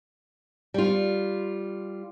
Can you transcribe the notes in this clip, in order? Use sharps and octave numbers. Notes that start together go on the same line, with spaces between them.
G3 F4